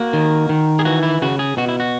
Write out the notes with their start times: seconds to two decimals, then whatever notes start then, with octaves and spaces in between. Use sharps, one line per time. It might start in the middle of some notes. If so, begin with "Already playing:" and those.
Already playing: A#3 F#4
0.13 D#3
0.49 D#3
0.79 G#4
0.85 E3 F#4
1.03 E4
1.22 C#3 F#4
1.39 G#4
1.57 B2 F#4
1.68 E4
1.80 F#4